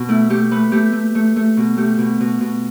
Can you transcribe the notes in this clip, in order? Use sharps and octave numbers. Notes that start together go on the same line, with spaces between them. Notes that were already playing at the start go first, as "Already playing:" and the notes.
Already playing: B2
A3 E4
A3 G4
A3 B4
A3 G4
A3
A3
A3
B2
A3 G4
B2
B2
B2